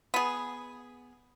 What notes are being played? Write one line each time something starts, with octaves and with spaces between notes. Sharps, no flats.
B3 G#4